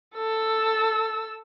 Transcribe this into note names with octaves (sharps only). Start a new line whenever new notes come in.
A4 E6